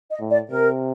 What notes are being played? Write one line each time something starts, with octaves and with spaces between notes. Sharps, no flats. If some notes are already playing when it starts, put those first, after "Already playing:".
D#5
A2
D5
C3 A#4